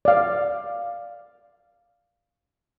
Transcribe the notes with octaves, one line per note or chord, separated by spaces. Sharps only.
D5 F5